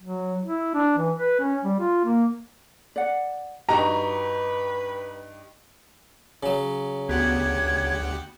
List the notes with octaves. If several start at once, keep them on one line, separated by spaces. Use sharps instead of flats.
F#3
E4
D4
E3
B4
C#4
G3
F4
A#3
D5 F#5
G2 D#4 F#4 G4 B4 A#5
C#3 F#3
D2 B3 F#4 G4 F#5 G#6